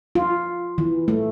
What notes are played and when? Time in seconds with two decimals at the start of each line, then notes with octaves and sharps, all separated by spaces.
0.15 F4
0.78 E3
1.08 A3